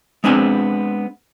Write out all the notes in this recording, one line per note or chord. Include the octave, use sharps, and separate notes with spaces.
G#3 B3 C4 D4 G#5